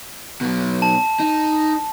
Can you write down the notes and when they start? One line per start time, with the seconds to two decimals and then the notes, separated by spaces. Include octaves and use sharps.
0.41 B2 F#3
0.82 A5
1.20 D#4